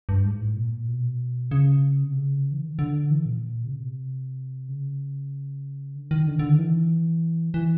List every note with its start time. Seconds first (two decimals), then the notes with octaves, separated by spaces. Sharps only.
0.09 G2
0.25 G#2
0.41 A2
0.56 A#2
0.88 B2
1.51 C#3
2.04 C3
2.15 C#3
2.52 E3
2.65 D#3
2.79 D3
3.10 E3
3.26 A#2
3.65 C#3
3.73 C3
4.69 C#3
5.95 D3
6.11 D#3
6.27 D3
6.39 D3
6.49 D#3
6.58 E3
7.54 E3